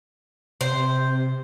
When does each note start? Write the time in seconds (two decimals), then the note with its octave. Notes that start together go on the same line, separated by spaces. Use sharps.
0.61 C3 C5